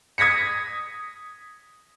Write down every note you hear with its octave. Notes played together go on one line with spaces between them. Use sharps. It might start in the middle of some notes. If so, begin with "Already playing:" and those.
D#6 G#6 A#6 B6 C#7